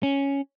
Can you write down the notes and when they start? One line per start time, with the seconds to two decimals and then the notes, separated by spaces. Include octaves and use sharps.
0.03 C#4